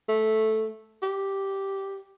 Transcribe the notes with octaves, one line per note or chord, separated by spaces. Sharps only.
A3
G4